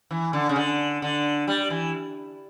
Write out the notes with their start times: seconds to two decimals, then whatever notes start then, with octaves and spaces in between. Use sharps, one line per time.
0.11 E3
0.33 D3
0.49 C#3
0.56 D3
1.02 D3
1.48 G3
1.70 E3